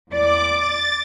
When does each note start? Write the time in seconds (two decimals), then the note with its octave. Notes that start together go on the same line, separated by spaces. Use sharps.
0.11 E2 D5 D6
0.55 A6